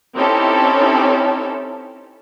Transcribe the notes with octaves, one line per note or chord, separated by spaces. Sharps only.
C4 C#4 D#4 E4 G4 A4